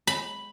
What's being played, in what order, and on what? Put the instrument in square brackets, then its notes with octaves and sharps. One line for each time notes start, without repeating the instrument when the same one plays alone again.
[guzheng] B5